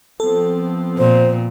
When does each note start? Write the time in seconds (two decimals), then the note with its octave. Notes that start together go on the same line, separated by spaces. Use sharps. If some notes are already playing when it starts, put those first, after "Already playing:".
0.20 F3 B3 C4 A4
0.98 A#2 C5